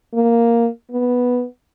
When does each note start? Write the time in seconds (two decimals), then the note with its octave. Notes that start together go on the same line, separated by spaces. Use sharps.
0.14 A#3
0.91 B3